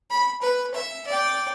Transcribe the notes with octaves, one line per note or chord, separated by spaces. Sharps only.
B5
B4
E5
D5 G5